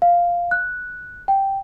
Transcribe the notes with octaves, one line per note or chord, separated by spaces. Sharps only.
F5
F#6
G5